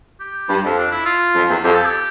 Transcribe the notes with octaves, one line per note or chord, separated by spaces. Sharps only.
G4
G2
F2
D4
E4
F4
F2
E2
F2 G4
A4
G4